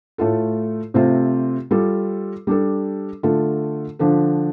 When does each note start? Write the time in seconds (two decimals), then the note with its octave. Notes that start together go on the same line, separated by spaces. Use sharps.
0.18 A2 A3 F4 A4
0.94 C3 A3 C4 F4
1.71 G3 F4 A4
2.47 G3 D4 A4
3.23 D3 A3 F4 A4
3.99 D3 F3 D4 A4